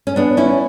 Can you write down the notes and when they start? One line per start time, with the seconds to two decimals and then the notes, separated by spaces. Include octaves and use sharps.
0.07 C#4
0.16 B3 D4
0.37 C#4 E4